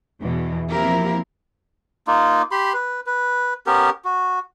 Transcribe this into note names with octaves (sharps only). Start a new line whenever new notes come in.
E2 B2 E3
F3 A#3 C4 E4 G4 A#4
A#3 D#4 F4
G4 B5 C6
B4
B4
B3 C#4 G4 A#4
F#4